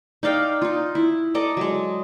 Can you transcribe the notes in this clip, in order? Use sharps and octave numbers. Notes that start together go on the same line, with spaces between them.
D#4 D5 F5 G5
D#4 F4
E4
A4 D5 D#5 A#5
F#3 G#3